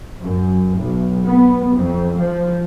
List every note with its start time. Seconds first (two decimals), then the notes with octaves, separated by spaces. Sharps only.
0.20 F#2
0.77 B1
1.27 B3
1.74 F2
2.21 F3